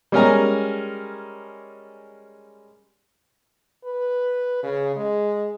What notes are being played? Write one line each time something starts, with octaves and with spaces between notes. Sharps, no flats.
G3 G#3 C#4 A#4 G#5 A#5
B4
C#3
G#3